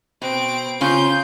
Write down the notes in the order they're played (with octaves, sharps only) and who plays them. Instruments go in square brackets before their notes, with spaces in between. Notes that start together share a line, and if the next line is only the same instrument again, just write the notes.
[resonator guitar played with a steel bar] B2 [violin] C4 D7
[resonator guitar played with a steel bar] C#3 C#4 F4 [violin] G6